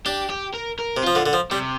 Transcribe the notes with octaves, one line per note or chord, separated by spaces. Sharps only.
D4 G4
G4
A#4
A#4
C3
F3 F4
D3
D3
F3
C3 G3